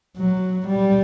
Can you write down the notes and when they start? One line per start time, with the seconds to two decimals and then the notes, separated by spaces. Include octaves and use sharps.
0.17 F#3
0.68 G3